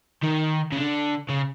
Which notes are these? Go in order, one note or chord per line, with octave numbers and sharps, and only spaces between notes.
D#3
C#3
D3
C#3